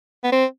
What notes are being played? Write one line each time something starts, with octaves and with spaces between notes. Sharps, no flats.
B3
C4